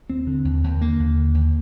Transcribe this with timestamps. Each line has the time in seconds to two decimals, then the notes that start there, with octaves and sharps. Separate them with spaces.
0.09 D#2 C4
0.27 D3
0.45 D#2
0.64 D#2
0.81 D3 A#3
1.00 D#2
1.17 D3
1.35 D#2